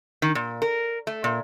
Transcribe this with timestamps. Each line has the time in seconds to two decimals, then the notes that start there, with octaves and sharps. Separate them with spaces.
0.22 D#3
0.35 A#2
0.62 A#4
1.07 A3
1.24 A#2